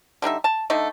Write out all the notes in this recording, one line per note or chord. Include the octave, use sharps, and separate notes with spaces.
D3 G3 D#4 E5
A5
D3 A3 D#4